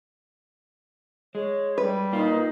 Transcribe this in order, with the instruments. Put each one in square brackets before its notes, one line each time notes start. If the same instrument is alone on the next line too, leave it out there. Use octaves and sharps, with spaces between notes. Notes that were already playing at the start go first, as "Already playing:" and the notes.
[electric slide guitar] G#3 [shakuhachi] C#5
[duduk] G3 [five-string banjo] B4
[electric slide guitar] A#3 F4 [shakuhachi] D#4